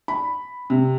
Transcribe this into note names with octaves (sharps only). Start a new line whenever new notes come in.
B5
C3